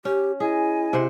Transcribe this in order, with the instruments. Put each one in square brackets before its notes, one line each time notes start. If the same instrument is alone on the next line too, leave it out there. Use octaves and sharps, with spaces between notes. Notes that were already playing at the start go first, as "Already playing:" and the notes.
[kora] C#4 [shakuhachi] G4
[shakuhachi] E4 [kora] G#4 [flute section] D#5 G#5
[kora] C3 C5 F#5